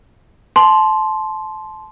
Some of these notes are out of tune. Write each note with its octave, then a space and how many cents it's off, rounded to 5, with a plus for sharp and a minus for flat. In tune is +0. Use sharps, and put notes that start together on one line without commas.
A5 -25 C6 +0